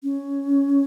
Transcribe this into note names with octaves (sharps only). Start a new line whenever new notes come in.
C#4